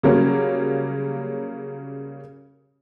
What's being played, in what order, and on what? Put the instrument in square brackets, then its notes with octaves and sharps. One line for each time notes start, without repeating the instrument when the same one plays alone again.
[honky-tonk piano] C#3 F#3 G3 A#3 C#4